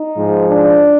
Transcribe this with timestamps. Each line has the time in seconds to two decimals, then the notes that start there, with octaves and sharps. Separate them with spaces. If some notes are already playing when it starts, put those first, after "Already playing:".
Already playing: D#4
0.17 G#2 F3
0.47 D4